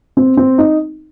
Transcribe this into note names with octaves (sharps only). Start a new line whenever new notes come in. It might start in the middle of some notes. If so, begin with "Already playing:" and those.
C4
C4
D#4